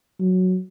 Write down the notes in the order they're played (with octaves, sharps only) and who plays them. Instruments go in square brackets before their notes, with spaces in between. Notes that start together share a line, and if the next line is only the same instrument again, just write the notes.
[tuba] F#3